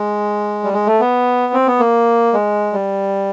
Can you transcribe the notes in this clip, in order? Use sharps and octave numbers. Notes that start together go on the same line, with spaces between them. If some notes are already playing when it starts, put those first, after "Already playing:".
Already playing: G#3
G3
G#3
A3
B3
C4
B3
A#3
G#3
G3